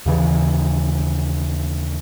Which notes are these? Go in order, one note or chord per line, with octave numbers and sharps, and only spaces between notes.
D#2 C#3 E3